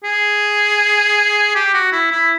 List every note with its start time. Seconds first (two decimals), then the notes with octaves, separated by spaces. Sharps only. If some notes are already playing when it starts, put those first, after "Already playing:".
0.04 G#4
1.55 G4
1.74 F#4
1.92 E4
2.11 E4